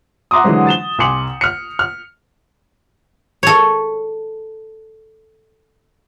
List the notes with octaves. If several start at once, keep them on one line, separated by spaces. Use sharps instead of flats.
E5 F#5 A#5 C6 D6 D#6
D3 E3 F#3 G#3 C4
A6 E7 G7
C2 G#5 C6 D6 C#7 F#7
F6 C#7
F6
A4 C#5